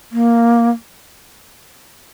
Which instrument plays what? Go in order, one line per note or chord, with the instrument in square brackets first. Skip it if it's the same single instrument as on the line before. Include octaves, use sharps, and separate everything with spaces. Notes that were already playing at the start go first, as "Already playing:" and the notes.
[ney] A#3